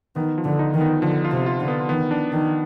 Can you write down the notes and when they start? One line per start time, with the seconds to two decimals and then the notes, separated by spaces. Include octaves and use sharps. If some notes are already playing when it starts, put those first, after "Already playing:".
0.16 D#3 B3
0.38 F3
0.44 D3
0.59 D#4
0.74 D#3
0.81 B3
1.02 D3 F3
1.25 F4
1.32 C3
1.46 F4
1.60 D3
1.68 B3
1.89 D#3 B3
2.11 D4
2.32 D#3 D4